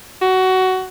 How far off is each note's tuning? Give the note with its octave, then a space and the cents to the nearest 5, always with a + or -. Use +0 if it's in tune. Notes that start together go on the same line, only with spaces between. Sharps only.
F#4 +15